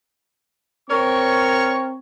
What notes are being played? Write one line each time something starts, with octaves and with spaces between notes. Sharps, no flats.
C4 A#4 C#5 C#6